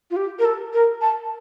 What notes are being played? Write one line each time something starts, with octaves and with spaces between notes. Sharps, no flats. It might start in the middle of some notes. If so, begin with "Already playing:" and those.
F4
G4
A#4
A4
A#4
A5